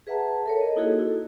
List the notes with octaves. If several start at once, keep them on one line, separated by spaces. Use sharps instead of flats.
G#4 B4 E5 F#5 A5 A#5
A4 A#4 C#5
D#5
A#3 D#4 E4 F#4 G#4 A4
E4